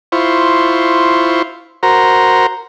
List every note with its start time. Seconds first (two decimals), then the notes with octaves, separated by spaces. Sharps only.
0.12 E4 F4 C5 C#6
1.83 F#4 A#4 C5 A#5